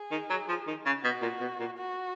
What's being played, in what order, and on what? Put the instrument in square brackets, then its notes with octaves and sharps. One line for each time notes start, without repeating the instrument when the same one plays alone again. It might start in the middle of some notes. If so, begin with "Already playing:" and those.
Already playing: [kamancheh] G#4
[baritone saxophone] D#3
F#3
F3
D#3
C#3
[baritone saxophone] B2 [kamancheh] F#4
[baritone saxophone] A#2
B2
A#2
[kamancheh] F#4